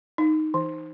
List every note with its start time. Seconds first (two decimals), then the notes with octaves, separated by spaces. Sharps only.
0.18 D#4
0.54 E3